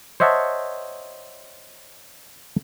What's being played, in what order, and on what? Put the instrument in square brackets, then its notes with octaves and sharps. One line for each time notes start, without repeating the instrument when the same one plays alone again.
[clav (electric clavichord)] C5 C#5 D#5 E5 F#5 A5